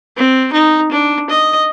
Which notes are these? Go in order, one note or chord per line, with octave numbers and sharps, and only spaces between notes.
C4
D#4
D4
D#5